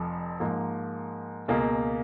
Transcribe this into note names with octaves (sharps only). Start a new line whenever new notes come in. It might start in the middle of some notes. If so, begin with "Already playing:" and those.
Already playing: F1 F2 F3
G#2 F3 A#3
C#2 B2 A#3 F4 G#4